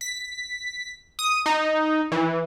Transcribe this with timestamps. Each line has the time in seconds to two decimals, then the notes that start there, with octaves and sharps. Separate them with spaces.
0.01 B6
1.19 D#6
1.46 D#4
2.12 E3